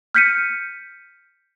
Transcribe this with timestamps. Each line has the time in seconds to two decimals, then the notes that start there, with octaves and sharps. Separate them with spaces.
0.15 F6 G6 B6 C#7 D#7